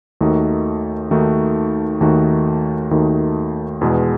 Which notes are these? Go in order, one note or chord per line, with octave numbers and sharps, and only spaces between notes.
D#2 D#3 A3 D#4 F#4
D#2 D#3 A3 D#4 F#4
D#2 D#3 A3 D#4 F#4
D#2 D#3 A3 D#4 F#4
E2 B2 G#3